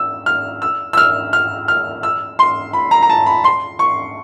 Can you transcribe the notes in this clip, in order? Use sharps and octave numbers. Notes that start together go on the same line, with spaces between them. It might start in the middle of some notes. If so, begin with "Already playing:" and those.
Already playing: E6
F6
E6
E6
F6
F6
F6
E6
C6
B5
A#5
A#5
A5
B5
C6
C#6